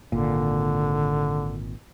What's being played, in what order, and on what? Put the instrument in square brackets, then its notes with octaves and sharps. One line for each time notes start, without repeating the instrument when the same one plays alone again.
[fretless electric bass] G#1 A#2 [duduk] D3